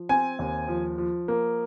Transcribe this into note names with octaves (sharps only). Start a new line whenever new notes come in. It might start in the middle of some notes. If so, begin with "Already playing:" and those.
Already playing: F3
C4 G#5
D#2
F3
F3
A#3